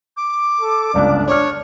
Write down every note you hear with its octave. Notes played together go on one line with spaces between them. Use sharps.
D6
A4
G1 C#2 D4 D5
D4 C#5 D6 F6